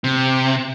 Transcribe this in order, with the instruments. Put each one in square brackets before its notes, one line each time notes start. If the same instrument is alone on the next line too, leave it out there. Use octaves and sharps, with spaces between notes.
[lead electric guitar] C3